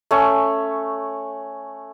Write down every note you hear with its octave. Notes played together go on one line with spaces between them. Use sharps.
A3 C#4